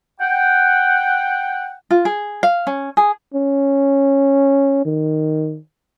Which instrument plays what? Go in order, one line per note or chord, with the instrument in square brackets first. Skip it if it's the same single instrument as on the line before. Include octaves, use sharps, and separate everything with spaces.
[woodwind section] F#5 G5
[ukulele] F4
G#4
F5
C#4
G#4
[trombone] C#4
D#3